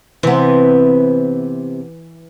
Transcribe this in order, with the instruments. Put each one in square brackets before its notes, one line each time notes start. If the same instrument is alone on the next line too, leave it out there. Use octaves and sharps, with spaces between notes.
[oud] C3 B3 [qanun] E3